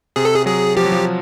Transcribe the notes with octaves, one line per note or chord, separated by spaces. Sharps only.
C3 G#4
A4
G#4
F#3 G#4
F3 G4
F#3
F3